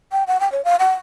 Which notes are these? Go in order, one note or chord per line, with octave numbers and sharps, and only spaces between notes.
G5
F#5
G5
C#5
F5
F#5